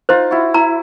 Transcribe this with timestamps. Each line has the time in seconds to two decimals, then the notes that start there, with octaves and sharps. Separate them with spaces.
0.09 D#4 F4 C5
0.31 E4 F#4
0.54 E4 A#5